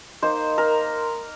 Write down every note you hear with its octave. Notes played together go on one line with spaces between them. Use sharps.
A#3 D#4 C5
A#4